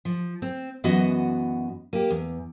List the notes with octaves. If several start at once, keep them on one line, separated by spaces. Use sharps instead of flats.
F3
C4
F#2 E3 B3 F#4 D#5 F#5
A#3 G4
E2